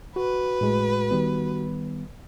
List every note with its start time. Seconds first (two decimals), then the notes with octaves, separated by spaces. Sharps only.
0.16 F#4 B4
0.61 A2 G#3
1.11 D#3 G3 B3